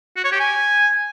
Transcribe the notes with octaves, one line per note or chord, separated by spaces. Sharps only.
F#4
C#5
G4
G#5